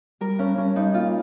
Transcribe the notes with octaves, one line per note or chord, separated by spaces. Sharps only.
G3 A#4
G2 C#4
G2 C#4
G2 D#4
A#2 F4